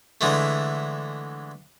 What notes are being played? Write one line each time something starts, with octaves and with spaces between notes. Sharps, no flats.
D3 E3 G#3 A3